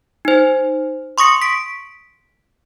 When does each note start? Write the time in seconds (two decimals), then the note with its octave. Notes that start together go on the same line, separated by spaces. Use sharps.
0.25 D#4 C5
1.18 C6 C#6 D#6 A#6 C#7
1.42 B6 D7